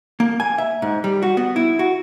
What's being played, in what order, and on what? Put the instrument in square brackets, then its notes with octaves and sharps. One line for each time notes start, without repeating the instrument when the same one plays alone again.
[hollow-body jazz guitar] A#3
G#5
E5
G#2
G3
F#4
B3
E4
F#4